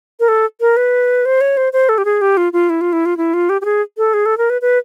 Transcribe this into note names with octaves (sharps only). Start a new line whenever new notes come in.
A#4
A4
A#4
B4
C5
C#5
C5
C5
A4
G4
G#4
G4
F4
F4
E4
F4
E4
F4
E4
F4
G4
G4
G#4
A4
G#4
A4
A#4
B4
B4